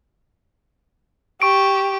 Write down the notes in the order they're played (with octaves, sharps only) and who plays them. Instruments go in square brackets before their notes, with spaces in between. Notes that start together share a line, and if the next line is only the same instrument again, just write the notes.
[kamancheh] G4 [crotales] C#6 D7